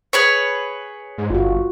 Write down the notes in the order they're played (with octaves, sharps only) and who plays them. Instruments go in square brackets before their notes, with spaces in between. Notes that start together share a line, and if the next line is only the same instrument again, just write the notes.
[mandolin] G#4 B4 C#5
[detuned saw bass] G#2
[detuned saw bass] G1 [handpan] F4 F#4